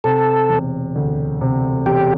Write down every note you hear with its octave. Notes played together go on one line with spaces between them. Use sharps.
C3 A4
E1
D2
C3
E1 G4